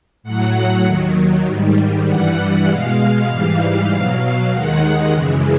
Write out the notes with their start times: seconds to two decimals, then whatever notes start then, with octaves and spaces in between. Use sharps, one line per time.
0.23 A2 F#3 F#5
0.84 D#2 D#3 F#3
1.45 G#2 D#3 G3
2.06 G2 E3 G3 F#5
2.68 B2 G#3 F5
3.28 G#2 E3 G3
3.90 B2 F#3
4.51 D#2 D#3 G#3 F#5
5.12 F#2 C#3 E3 G#3